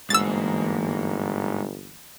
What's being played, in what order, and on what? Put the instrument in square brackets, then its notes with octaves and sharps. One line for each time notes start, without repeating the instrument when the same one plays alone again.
[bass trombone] G1 [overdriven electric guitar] G#2 [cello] E3 A#3 [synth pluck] E6 A6